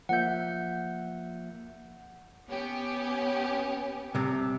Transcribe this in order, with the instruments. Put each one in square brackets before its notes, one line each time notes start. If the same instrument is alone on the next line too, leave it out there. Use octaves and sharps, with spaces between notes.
[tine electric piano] F3 A#3 E5 [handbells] F#5 G6
[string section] B3 C#4 G4
[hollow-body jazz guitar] C2 C3